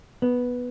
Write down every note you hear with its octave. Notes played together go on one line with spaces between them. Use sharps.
B3